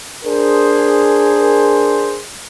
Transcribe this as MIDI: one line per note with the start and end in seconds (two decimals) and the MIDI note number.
0.24 2.19 62
0.24 2.19 68
0.24 2.19 70
0.24 2.19 72